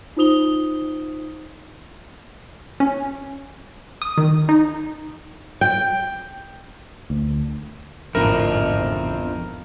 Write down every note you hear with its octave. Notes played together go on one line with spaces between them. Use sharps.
D#4 F4 C5 D#6 F7 G7
C#4
D#6
D#3
D#4
G5
D2
A1 F2 G#2 B2 D3 E4 A#4